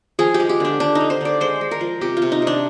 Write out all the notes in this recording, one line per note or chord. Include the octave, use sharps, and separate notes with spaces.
F3 G#4
G4
G#3
G4
D3 D4
D3 D4
D#4
D3
C5
D3 D5
G#3 C5
G#3
A#4
F3
C3 G4
F4
C3
D#4
C3 D4